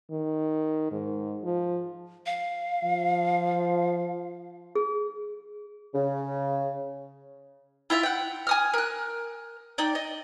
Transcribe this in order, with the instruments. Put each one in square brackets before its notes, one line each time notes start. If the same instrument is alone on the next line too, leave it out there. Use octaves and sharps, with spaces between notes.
[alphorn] D#3
G#2
F3
[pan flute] F5
[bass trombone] F3
[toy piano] G#4
[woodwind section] C#3
[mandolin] E4 F4 E5 F5
F#5 G5
G#5 D#6 F6
A#4 F#6
D#4 D5 G5
D#5